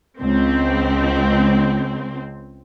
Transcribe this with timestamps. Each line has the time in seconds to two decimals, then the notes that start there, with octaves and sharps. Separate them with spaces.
0.19 C#2 C4